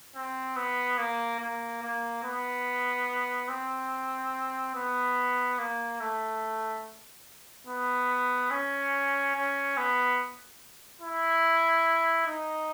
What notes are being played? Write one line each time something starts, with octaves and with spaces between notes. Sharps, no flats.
C4
B3
A#3
A#3
A#3
B3
C4
B3
A#3
A3
B3
C#4
C#4
B3
E4
D#4